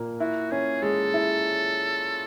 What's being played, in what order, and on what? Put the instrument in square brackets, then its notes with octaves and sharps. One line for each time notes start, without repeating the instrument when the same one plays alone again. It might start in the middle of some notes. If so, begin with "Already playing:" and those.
Already playing: [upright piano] A#2 A#3
[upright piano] E4 [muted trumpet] F#4
[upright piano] C#4 [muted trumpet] G#4
[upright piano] G#3 [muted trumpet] A4
[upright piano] E4